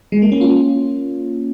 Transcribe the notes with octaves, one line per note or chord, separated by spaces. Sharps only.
G#3
A#3
C#4
F4